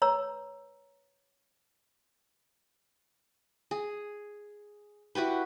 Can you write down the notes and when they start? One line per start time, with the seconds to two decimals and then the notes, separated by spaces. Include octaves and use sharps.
0.02 B4 C#5 A#5 E6
3.71 G#4
5.15 E4 F#4 G4 B4